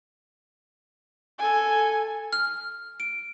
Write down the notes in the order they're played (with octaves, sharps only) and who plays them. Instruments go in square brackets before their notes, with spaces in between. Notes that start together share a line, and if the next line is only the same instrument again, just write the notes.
[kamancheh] A4 G#5
[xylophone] F6
D7